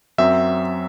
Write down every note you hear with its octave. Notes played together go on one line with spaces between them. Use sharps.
F#2 F#3 C4 E5